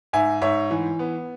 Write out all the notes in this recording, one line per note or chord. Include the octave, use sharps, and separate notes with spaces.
G#2 E5 G#5
G#2 C#5 E5
E3
B3